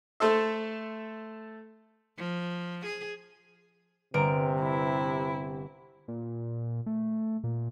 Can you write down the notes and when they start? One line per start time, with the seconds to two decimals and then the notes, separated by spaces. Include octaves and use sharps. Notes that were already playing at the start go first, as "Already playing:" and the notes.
0.20 A3 A4 C5 E5
2.18 F3
2.86 G#4
4.14 G1 C3 A#4 B4 A#5 D7
4.61 E4
6.08 A#2
6.86 A3
7.44 A#2